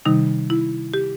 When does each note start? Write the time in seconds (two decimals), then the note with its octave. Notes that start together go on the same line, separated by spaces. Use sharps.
0.06 C3 D#3 G3 D#4
0.50 E4
0.94 G4